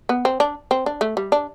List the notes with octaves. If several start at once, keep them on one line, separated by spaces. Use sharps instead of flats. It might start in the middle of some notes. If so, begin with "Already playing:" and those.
B3
C4
D4
C4
D4
A3
G3
D4